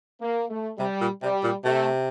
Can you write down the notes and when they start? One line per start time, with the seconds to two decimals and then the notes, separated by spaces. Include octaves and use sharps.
0.22 A#3
0.50 A3
0.78 C3 G3
1.01 A#2
1.22 C3 G3
1.44 A#2
1.65 C3 A3